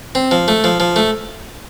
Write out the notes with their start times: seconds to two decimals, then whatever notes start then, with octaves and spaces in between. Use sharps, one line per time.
0.15 C4
0.31 F3
0.48 A3
0.64 F3
0.80 F3
0.96 A3